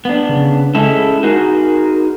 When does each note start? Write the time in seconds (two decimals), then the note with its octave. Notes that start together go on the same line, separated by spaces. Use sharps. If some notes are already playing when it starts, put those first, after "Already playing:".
0.05 B3 D4
0.29 C#3
0.75 G#3 C#4 E4 A4
1.23 D#4 F#4 G#4 A#4